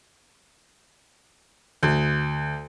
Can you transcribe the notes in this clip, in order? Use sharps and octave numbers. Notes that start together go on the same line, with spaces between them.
D2